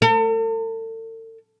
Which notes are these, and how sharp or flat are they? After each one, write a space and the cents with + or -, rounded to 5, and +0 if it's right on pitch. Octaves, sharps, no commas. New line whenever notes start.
A4 +40